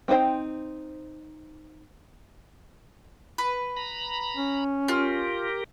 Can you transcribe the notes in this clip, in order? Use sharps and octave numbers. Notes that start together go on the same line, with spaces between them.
C4 C#4 D#4 C5 G5
B4
A#5 B5
C#4
F4 G4 A#4 F6